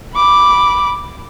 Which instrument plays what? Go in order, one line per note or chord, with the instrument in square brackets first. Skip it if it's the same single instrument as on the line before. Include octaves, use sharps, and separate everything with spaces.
[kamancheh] B5 D6